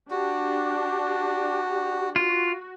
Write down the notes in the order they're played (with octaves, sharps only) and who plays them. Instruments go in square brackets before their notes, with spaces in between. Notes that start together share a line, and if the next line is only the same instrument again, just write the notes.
[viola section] D4 G4 [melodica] F#4
[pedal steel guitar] F4 [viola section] F#4